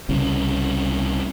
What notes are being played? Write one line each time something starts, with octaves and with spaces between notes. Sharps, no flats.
C2 C#3